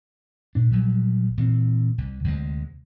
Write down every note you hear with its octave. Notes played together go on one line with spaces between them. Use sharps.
A#2 D4
A#1 F#3 G3
A#2 E3 C4
C2
D2 C3 G#3